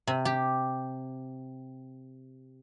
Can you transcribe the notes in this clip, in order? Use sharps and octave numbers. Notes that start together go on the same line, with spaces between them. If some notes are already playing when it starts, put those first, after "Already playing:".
C3
G4